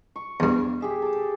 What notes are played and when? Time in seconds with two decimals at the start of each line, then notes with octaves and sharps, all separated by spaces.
0.16 C#6
0.40 E2 G2
0.81 G4 G#4 E5
1.02 A4 D6